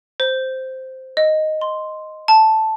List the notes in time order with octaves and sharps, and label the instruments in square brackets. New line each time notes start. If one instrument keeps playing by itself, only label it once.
[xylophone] C5
D#5
C6
A5